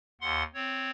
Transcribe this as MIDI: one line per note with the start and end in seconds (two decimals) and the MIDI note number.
0.21 0.43 39
0.21 0.43 78
0.21 0.43 84
0.54 0.91 60
0.54 0.91 73